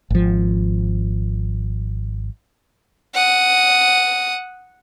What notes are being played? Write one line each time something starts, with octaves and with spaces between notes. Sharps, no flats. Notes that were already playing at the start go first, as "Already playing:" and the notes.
G#1 F3
F#5 D#6